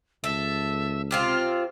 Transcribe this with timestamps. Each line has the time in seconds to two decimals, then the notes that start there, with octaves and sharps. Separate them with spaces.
0.24 C#2 A4 E5
1.11 C3 C4 F4 F6